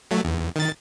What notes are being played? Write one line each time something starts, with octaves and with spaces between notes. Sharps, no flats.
F#3 A3
E2
D#3 A6